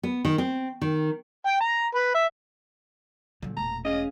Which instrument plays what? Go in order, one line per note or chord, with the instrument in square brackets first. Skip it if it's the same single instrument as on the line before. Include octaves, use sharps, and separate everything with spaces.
[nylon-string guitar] B3
D#3
C4
D#3
[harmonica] G5
A#5
B4
E5
[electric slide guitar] A#2 [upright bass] D3 F#3
[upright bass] E1 A3 [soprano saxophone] A#5
[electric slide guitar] C#4 G#4 F5 [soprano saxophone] D#5